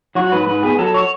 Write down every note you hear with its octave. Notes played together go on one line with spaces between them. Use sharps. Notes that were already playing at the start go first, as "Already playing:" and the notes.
F#3 F#4
G#2 B4
G#2 B4
B3 G#4
F#3 A4
C#5